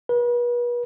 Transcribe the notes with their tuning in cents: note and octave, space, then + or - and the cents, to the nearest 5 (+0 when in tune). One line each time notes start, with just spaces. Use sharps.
B4 -40